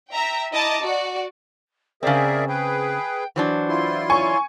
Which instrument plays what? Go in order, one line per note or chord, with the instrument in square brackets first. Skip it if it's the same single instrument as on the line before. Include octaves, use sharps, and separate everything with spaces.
[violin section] E5 G5 A#5
E4 D#5 A5 A#5 D6
F#4 D5
[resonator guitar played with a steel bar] C#3 C4 [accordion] G#4 A#4 E5 [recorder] D5
[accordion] G#4 B4 [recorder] G5
[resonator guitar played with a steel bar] E3 F#3 D4 [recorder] C5
[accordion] E4 F4 C6
[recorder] C#5 [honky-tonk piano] G#5 C#6